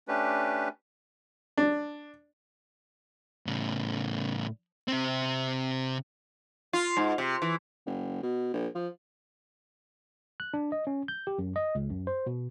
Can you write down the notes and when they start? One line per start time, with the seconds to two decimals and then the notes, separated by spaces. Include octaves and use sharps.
0.08 A3 C#4 D4 G4 B4
1.58 D4
3.46 A2 C#3
4.88 C3 C4
6.73 F4
6.97 G#2
7.18 C3
7.42 E3
7.86 F#1
8.23 B2
8.53 A#1
8.75 F3
10.40 F#6
10.54 D4
10.72 D#5
10.87 C#4
11.08 G6
11.27 G4
11.38 F#2
11.56 D#5
11.75 C#2
11.90 F#2
12.07 C5
12.26 B2